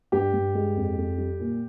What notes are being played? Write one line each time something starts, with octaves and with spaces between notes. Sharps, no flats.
G2 G4
G2
G#3
F2
F2
G3
A#2